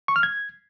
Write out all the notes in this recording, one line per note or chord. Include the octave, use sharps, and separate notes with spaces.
C#6
F6
G#6